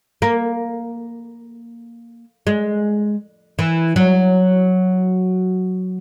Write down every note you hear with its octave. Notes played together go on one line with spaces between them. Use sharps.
A#3
G#3
E3
F#3